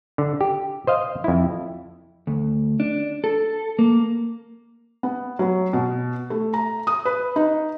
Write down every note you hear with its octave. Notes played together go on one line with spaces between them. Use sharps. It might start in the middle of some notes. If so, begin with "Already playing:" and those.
D3
G4
C5 D#5 F5
F2 E4
D2
D4
A4
A#3
B3
F#3
B2
A3
A#5
D#6
B4
D#4